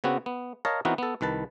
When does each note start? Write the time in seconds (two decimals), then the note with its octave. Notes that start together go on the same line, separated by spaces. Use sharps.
0.04 C#3 B3 C4 F#4
0.26 B3
0.65 A#4 C#5 D#5 F5 A5 A#5
0.85 E3 B3 C4 D#4 F#4 A#4
0.98 B3 A4
1.21 C2 D#3 B4 A5